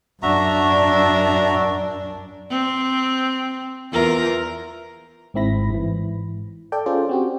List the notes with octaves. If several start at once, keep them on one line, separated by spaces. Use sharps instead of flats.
F#2 D4 F#4 E5 A#5
C4
E2 F4 A#4
G#1 G#2 C4 E4 B5 A#6
G#2 E3
A4 D5 G5
C#4 F4 G#4 A4 C5 D5
C4 F#4 G4